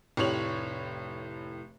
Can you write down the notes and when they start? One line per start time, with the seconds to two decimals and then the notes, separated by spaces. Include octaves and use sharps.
0.17 F1 A2 G4 C#5 F7 F#7